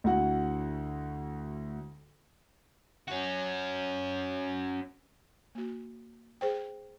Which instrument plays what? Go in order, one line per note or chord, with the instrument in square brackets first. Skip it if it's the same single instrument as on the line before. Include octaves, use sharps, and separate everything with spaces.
[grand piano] D2 D3 E4 F#4 F#5
[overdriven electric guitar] C#4 F#4
[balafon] A#3 F#4
G#4 C5 G5